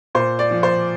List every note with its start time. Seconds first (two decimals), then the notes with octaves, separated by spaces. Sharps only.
0.15 A#2 C5
0.39 D5
0.51 F3
0.63 C5